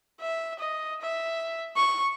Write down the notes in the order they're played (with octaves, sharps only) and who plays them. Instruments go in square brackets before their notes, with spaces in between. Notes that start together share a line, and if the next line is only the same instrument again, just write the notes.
[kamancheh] E5
D#5
E5
C#6